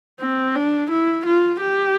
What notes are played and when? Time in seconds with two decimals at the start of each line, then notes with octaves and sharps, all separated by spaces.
0.20 C4
0.55 D4
0.91 E4
1.26 F4
1.61 G4